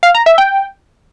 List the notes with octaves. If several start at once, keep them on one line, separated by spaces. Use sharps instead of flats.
F5
A#5
E5
G5